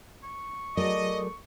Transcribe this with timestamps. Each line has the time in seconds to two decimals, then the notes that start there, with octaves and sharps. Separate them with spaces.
0.23 C#6
0.77 F#3 A3 G#4 A#4 D5 D#5